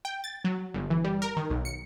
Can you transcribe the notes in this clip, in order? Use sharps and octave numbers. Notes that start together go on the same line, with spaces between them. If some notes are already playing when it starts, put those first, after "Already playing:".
G5
A6
F#3
G1
E3
G3
A#4
D#3
B1
C#7